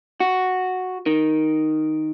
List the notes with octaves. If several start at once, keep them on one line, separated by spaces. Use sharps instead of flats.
F#4
D#3